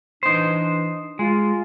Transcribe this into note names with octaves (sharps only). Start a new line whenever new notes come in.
E3 D4 D#4 C5
G#3 F4